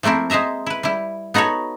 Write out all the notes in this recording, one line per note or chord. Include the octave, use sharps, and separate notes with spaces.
F3 A3 A#3 C4 E4
G#3 C5 D#5 E5 A#5
E4 B4
G3 E4
B3 D#4 F#4 A4 C#5